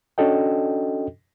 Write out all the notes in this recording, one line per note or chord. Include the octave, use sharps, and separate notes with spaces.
C#4 D4 F#4 A4 D#5 G5